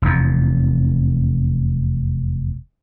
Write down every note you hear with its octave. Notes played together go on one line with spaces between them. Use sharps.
F1 E2